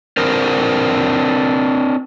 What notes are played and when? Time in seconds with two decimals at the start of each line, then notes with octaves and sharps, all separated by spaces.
0.17 C4 D4 A#4 C5